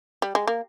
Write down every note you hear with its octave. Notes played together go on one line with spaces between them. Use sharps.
G3
G#3
A#3